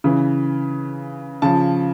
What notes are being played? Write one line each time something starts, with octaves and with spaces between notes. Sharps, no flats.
C#3 E3
C#3 F3 A5